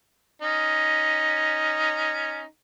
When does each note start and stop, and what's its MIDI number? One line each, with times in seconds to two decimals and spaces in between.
0.42 2.44 61
0.42 2.44 63